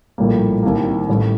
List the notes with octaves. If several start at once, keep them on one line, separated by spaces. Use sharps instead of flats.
A#1 A2 G3 A#3
C2 C3 D#3 G3 A#3
A1 A2 G3